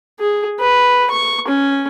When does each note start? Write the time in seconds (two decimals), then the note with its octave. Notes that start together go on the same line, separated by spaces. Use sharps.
0.20 G#4
0.60 B4
1.11 C#6
1.48 C#4